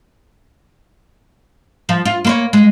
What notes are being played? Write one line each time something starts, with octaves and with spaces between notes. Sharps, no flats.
F3
F4
A#3 C5 C#5
G#3